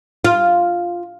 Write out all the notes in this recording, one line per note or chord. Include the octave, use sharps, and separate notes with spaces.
F4